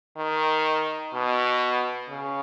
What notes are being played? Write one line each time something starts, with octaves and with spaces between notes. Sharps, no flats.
D#3
B2
C#3